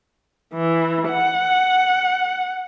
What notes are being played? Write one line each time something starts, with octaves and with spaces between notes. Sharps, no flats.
E3
F#5